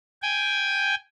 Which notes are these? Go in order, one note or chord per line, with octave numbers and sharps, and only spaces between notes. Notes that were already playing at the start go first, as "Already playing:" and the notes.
G5 G#5